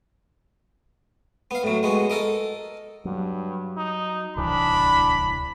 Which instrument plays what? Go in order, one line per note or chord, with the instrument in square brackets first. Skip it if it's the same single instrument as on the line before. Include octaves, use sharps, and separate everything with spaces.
[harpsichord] B3 F5
A2 F#3
G#3 B3 F#4
A4 A#4 D#5
[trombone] G2 [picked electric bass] F#3
[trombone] D#4
[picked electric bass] D1 C2 E3 [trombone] D4 [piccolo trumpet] B5